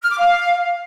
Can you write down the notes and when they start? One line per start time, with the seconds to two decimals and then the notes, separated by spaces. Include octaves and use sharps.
0.03 F6
0.11 D6
0.19 F5